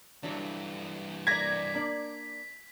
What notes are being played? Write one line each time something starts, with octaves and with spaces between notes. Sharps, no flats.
G2 D3 E3 F#3 D4
A#3 D5 G#6 A#6 B6
A#3 D4 D5